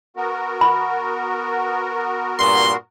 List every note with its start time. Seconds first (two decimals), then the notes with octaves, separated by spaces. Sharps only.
0.17 B3 F#4 A#4
0.61 B5
2.39 G2 A#2 C6